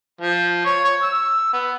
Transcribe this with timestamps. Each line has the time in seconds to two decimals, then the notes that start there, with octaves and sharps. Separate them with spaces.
0.21 F3
0.65 C#5
0.84 C#5
1.03 E6
1.53 B3